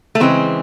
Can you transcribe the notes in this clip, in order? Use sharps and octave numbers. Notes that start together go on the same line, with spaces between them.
A3
C#3 E3 G#3 C4